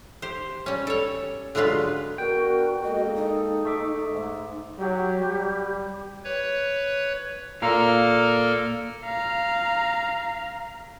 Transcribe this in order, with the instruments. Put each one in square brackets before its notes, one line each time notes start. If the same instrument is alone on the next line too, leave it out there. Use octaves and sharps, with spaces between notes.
[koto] G4 C5
G3 C#4
A4 C#5
D3 F#3 G#3 F4 B4
[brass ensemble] B3 D4 A#4 [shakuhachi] F#4 [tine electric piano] G5
[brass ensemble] G#3 A#3 A4 [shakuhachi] D#5
[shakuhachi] D#4
[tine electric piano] A3 E5 D6
[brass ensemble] G#2
[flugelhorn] F#3 [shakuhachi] G4
[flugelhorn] G3
[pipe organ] B4 C#5
[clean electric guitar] A#2 A#4 F5 [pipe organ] A#3 A4 F6
[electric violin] F5 A#5